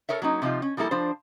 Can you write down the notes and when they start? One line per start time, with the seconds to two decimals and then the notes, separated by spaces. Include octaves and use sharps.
0.09 A4 A#4 C#5 E5
0.22 F#3 A#3 C#4 D#4
0.42 C3 F3 D#4 F4
0.62 C#4
0.77 F3 G3 A#3 E4 A4
0.91 F3 D4 C5